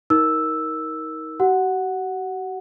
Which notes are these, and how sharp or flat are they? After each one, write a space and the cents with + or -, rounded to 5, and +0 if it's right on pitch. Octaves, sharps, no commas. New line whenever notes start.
D#4 +25 A#4 +5 E6 +0
F#4 +45 F#5 +0